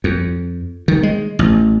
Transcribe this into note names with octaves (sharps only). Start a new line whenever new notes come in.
F2
D#3
G#3
A1